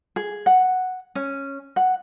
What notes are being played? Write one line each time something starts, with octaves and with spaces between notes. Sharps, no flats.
G#4
F#5
C#4
F#5